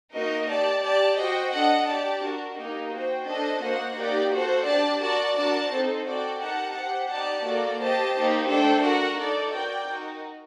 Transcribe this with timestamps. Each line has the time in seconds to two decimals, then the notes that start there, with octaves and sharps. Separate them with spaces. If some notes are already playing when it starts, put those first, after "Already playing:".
0.13 A#3 D#4 F#4 A#4 D#5
0.48 G4 D5 A5
0.83 G4 D5 A5
1.17 F#4 C5 D#5 G5
1.52 D4 A4 D#5 F#5
1.87 G4 D5 A5
2.22 D4 F#4 A#4
2.57 A#3 D#4 G4 A#4
2.92 F#4 C5 G5
3.27 D4 A4 C5 D#5 A5
3.61 A#3 F#4 C5 F#5
3.96 A#3 D#4 G4 D5
4.31 F#4 A4 C5 F#5
4.65 D4 G4 D5 A5
5.02 F#4 A#4 D5 A5
5.36 D4 F#4 A#4 D5 A5
5.70 C4 D#4 A4 C5
6.06 F#4 A4 D5 G5
6.40 D#4 G4 A#4 F#5 A5
6.76 G4 C5 F#5
7.10 D#4 G4 D5 A5
7.45 A#3 F#4 A4 D5
7.80 G4 C5 D#5 A5
8.15 A#3 D#4 G4 C5
8.49 A3 D4 A4 C5 G5
8.84 F#4 A#4 F#5
9.19 D#4 A4 D5
9.54 F#4 A#4 D5 G5
9.88 D#4 F#4 A#4